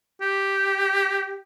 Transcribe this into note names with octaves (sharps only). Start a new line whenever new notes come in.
G4